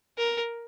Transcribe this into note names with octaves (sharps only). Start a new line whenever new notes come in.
A#4